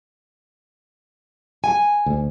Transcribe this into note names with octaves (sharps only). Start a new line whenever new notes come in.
G#5
D2